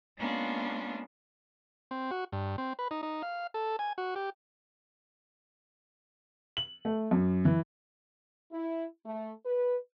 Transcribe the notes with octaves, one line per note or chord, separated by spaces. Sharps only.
G#3 A#3 B3 C#4 D4 F4
C4
F#4
G2
C4
B4
D#4
D#4
F5
A4
G#5
F#4
G4
F#7
A3
F#2
E3
E4
A3
B4